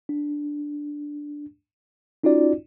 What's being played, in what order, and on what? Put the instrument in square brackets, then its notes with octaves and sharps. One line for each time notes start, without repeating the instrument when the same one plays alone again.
[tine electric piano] D4
C#4 D#4 F4 F#4 D5